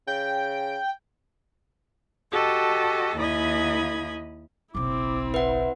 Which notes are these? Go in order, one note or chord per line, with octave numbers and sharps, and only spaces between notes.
C#3 G5
F#4 G4 A4 D#5 A5
D#2 E4 D#5 B5 D#6 G#6
F#1 B1 C4 E4 D6
B4 E5 F#5